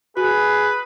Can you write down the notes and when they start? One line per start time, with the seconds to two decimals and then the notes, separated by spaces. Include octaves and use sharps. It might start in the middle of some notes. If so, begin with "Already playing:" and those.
0.17 F#4 G#4 B4